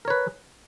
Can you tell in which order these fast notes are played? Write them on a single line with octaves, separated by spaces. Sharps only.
A#4 C#5 B4